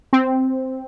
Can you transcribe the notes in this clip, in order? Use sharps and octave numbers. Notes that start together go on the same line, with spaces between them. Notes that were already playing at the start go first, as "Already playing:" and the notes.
C4